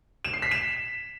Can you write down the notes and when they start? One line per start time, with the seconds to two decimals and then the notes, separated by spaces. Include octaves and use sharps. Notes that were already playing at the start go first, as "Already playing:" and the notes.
0.25 E7
0.33 C7
0.42 B6
0.51 E7